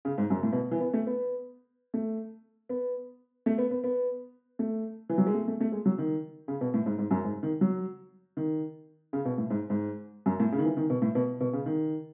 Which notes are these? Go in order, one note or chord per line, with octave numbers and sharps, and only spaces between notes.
C#3
G#2
F#2
A2
B2
E3
B3
A3
B3
A3
B3
A3
B3
B3
B3
A3
E3
F#3
G#3
A3
A3
A3
G#3
F#3
D#3
C#3
B2
A2
G#2
G#2
F#2
G#2
D#3
F#3
D#3
C#3
B2
A2
G#2
G#2
F#2
A2
C#3
D#3
E3
D#3
B2
A2
B2
B2
C#3
D#3